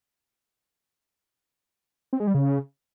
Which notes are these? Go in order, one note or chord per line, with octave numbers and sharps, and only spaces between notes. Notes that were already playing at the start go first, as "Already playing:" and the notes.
C4
G#3
G3
C#3